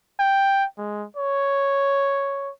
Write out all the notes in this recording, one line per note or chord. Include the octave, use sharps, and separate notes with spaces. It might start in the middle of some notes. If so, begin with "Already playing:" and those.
G5
G#3
C#5